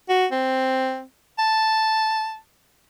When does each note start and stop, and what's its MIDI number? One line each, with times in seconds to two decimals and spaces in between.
0.09 0.26 66
0.32 1.02 60
1.39 2.37 81